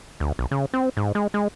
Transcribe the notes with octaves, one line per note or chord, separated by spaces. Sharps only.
D2
B1
C#3
C4
G#2
G#3
G#3